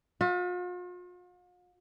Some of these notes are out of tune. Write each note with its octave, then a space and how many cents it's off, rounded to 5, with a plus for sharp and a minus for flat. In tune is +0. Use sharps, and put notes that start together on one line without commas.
F4 +45 E5 +0